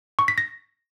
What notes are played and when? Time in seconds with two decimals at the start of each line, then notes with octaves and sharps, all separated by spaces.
0.19 C#6
0.28 B6
0.38 A#6